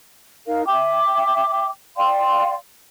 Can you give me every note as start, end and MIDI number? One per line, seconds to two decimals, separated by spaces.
0.46 0.63 63
0.46 0.63 70
0.46 0.63 77
0.67 1.68 76
0.67 1.68 79
0.67 1.68 86
1.96 2.54 74
1.96 2.54 77
1.96 2.54 79
1.96 2.54 84